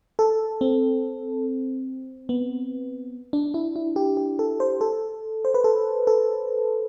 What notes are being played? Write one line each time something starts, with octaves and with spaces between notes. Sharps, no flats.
A4
C4
B3
D4
E4
E4
G4
G4
A4
C5
A4
C5
B4
A4
A4